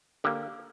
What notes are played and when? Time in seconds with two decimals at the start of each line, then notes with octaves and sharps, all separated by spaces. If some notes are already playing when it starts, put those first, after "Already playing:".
0.24 D3 A#3 G4